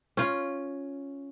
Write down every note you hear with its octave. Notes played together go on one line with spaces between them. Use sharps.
C#4 F4